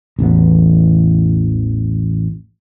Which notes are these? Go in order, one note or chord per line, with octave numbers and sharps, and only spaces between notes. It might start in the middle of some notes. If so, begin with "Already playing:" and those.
A1 E2 B3